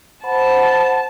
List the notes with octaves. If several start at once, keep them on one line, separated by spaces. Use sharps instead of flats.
C5 F#5 A5 B5